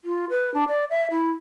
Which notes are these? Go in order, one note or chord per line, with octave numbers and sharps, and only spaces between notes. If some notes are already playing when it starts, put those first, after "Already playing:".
F4
B4
D4
D5
E5
E4